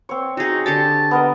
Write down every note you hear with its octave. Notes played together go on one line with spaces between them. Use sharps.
C4 C#5
D#4 F#4 G#4
D3 G4 A5 D6
B3 A#4 D#5